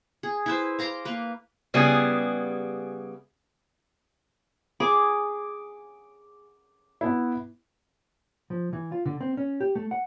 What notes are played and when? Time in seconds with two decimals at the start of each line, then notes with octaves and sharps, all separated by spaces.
0.23 G#4
0.46 E4 B4 C5
0.79 F5 A#5 C6 D6
1.05 A#3 B4
1.74 C#3 G3 B3 E4 G4 G#4
4.80 G#4 D6
7.01 B3 E4
8.50 F3
8.73 E3
8.92 F4
9.06 D3
9.21 C4
9.37 C#4
9.60 G4
9.76 A3
9.91 F#5